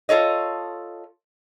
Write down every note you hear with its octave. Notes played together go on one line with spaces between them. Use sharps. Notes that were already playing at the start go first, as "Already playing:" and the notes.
F4 A4 C#5 D#5